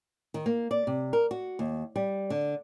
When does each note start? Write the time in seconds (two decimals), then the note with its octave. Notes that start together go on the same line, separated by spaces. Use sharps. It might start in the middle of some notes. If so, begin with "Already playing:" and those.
0.34 D#3
0.46 A#3
0.71 D5
0.87 C3
1.13 A#4
1.31 F#4
1.59 D#2
1.96 G3
2.30 D3